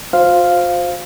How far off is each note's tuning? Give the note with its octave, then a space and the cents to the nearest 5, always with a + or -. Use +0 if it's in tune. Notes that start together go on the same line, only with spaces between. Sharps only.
F4 +40 C5 +0 F5 +0